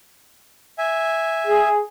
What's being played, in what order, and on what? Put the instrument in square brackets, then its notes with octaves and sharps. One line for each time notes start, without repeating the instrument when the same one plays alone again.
[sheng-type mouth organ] E5 G#5
[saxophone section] G#4